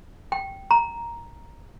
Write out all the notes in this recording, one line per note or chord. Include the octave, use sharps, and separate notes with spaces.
G5
A#5